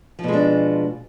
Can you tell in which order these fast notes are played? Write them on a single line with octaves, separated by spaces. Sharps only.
F3 B2 G#3 D4